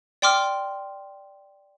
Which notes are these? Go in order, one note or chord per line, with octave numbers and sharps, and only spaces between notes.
D5 G5 C6 D6 F6